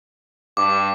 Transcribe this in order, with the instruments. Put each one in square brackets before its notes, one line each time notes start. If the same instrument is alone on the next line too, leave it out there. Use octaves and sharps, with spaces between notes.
[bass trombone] G2 [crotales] D6